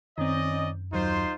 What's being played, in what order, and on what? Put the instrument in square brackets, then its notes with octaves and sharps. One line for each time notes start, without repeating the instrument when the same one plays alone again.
[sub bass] F#2 [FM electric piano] D#3 C4 [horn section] C#4 D5 D#5
[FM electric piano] D#2 F#3 [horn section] D#4 F4 C5